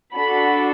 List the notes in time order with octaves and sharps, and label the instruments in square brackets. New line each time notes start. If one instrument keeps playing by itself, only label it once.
[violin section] D4 F#4 A4 B5